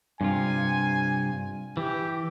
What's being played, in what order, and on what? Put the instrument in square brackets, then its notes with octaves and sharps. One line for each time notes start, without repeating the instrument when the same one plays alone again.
[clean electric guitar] G2 C3 F4 [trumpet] G#5
[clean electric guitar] E3 [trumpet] G4